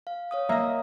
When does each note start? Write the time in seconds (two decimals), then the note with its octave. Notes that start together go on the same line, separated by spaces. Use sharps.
0.07 F5
0.31 C#5 F5 D#6
0.49 A#3 D#5 E5